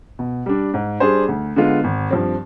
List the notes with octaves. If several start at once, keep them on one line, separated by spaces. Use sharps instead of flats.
B2
G3 D4
G#2
G3 D4 G#4 C5
D2
D3 G#3 B3 F4
G#1
G2 F3 C4